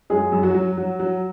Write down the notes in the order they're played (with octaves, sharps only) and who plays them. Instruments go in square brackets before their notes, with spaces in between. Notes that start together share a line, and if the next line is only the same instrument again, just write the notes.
[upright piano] F#2 G#3 G#4
F#2
F#3 F#4
F#3
F#3
F#3